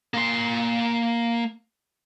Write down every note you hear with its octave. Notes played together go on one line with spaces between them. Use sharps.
A#3 C6